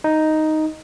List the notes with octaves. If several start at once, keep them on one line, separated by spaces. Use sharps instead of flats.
D#4